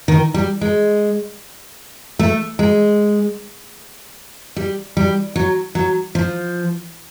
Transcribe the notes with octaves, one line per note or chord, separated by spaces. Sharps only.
D#3
G3
G#3
A3
G#3
G3
G3
F#3
F#3
F3